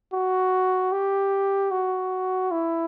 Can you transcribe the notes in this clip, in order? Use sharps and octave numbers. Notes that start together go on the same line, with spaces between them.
F#4
G4
F#4
E4